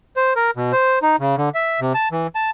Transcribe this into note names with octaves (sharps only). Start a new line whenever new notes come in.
C5
A#4
B2
C5
D#4
C#3
D3
E5
C3
A5
E3
A5